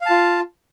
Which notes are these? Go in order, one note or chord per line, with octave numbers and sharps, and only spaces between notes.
F4 F5 A5